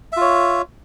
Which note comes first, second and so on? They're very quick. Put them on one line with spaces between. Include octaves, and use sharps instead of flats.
E5 F4 C#5